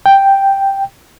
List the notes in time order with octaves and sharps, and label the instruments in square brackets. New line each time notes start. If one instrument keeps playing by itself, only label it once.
[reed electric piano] G5